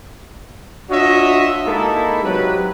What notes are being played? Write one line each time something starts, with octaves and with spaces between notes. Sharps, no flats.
D4 F4 F#4 C#5 D#5 E5
G#3 A#3 D#4 E4 A4
C3 F#3 G4 B4